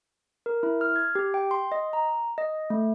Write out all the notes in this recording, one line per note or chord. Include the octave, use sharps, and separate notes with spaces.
A#4
E4
F6
G#6
G4
G5
C6
D#5
A#5
D#5
A3